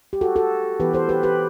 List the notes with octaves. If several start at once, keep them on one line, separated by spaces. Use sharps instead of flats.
G4
F#4 A4
F#4 A4
E3 B3 G4 B4
A4 C5
G4 B4
G4 B4